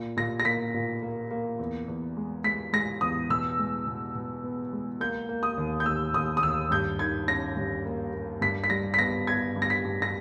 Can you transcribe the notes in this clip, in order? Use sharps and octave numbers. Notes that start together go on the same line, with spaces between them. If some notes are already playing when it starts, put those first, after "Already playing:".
Already playing: A#2
A#2 A#6
A#6
A#3 B6
A#2
A#3
A#3
E2
E2
G#3
G#3 B6
G#3 A#6
E2 D#6
B2 E6
G#3
B2
B2
B3
G#3
A#3 G6
A#3
D#6
D#2
G6
D#2 E6
D#2 D#6
D#6
D#2 E6
G2 G6
D#3 G#6
C#4 A#6
G2
A#3
A#3
G2 B6
B6
G3 A#6
B6
B3 A#6
B3 G#6
G2
A#6
B6
G2
A#6